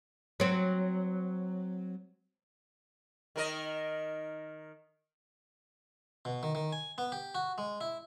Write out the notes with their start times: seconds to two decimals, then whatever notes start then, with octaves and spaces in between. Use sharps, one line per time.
0.40 F#3 C4
3.36 D#3 A#4 D#5
6.25 B2
6.43 D#3
6.55 D#3
6.73 G#5
6.98 B3
7.12 G4
7.35 F#4
7.58 G#3
7.81 E4